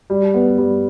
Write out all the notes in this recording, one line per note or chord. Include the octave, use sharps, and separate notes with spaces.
G3
B3
G3